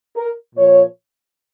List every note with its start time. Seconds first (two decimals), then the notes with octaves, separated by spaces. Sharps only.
0.16 A#4
0.55 A#2 F3 C#5